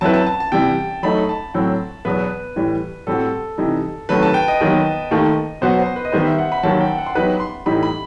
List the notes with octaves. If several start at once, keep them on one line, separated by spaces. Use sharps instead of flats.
F#3 C4 E4 B4 A5
A5
A5
A5
C3 E3 G3 G5
F#3 A3 D#4 B5
A5
A2 F#3 C4
E2 B2 F#3 B3 B4
A2 E3 G3
A2 G3 C4 F#4 A4
C3 E3 G3 D#4
C2 C3 D#3 F#3 A3 B4
A5
G5
D#5
D#2 D#3 F#3 B3
D#2 D#3 A3
B2 F#3 B3 F#4 C5
C5
B4
D#5
D#3 G3 B3 C5
E5
F#5
B5
D#2 D#3 F#3 A5
G5
F#5
C6
F#3 B3 D#4 G4 B4 B5
C6
A2 E3 G3 D#4 G4 B5
B5